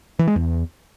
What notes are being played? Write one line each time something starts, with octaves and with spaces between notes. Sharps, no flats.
E3
G#3
E2